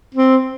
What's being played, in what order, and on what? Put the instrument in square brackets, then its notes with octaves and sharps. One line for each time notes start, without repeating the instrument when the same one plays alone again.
[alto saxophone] C4